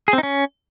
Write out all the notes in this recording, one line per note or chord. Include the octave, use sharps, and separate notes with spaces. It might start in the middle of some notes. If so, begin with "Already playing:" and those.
G#4
C4
D#4
C#4